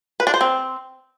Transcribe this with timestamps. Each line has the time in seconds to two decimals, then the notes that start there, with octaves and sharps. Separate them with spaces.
0.20 B4
0.27 D4
0.34 C5
0.41 C4